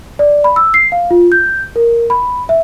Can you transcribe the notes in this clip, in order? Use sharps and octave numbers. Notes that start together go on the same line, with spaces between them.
D5
B5
E6
C7
F5
F4
G6
A#4
B5
E5